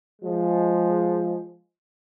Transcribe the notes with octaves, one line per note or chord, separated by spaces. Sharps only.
F3 G#3